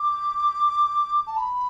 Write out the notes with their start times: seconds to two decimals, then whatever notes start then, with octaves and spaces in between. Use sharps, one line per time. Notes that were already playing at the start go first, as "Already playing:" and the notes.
Already playing: D6
1.27 A5
1.37 B5